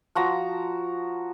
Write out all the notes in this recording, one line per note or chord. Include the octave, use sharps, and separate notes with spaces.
F3 F#4 A#5